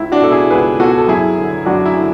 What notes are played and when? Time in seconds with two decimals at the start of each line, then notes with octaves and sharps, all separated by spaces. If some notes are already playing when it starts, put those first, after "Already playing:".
Already playing: C#2 E4
0.12 D4 F#4
0.21 B2 A4
0.31 E4 G#4
0.51 C#2 G#4 B4
0.79 B2 F#4 A4
0.98 A4
1.08 F#2 E4 G#4
1.38 D3
1.65 F#2 D4 F#4
1.86 E4
1.95 D3